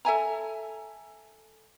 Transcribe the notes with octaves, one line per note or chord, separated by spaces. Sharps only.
A4 E5 G#5 A#5